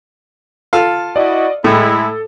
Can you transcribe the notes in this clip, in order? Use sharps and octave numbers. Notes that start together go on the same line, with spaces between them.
F4 A4 F5
E4 F#4 D5 D#5
A2 G#3 E4 A4